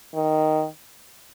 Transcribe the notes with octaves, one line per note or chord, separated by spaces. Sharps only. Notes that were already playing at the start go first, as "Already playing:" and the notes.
D#3